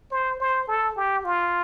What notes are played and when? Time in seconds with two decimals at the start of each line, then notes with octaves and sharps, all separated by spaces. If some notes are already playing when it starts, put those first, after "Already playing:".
0.11 C5
0.40 C5
0.68 A4
0.96 G4
1.24 F4